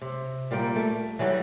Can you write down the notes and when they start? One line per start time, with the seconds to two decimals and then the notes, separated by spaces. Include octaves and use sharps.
0.01 C3
0.51 A#2 G3 A#3 G5
0.76 A3
1.19 E3 F#3 G3 F#4